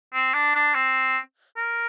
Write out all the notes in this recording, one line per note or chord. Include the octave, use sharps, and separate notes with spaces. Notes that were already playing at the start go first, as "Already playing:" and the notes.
C4
D4
D4
C4
A#4